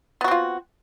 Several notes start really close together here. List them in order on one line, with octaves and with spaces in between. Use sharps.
B3 F#4 C4 F4